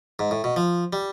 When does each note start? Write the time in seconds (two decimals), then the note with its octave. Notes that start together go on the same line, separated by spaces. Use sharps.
0.19 G#2
0.31 A2
0.44 B2
0.56 F3
0.93 G3